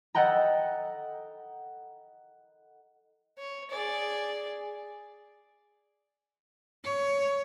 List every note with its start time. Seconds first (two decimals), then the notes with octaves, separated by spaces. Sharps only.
0.15 A4 D#5 F#5 G5 A#5
3.39 C#5
3.71 G#4 D5
6.84 C#5